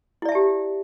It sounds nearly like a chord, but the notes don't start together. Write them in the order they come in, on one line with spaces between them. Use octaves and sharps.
E4 D5 E5 A5 G4